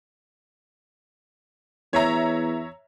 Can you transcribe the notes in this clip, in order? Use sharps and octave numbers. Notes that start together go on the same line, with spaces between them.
E2 C#5 E5 A#5